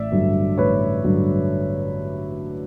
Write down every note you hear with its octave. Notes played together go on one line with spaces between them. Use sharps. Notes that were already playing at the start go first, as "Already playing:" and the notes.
Already playing: A1 D5 E5
G2 D3 F#3
A1 B4 C#5
G2 D3 F#3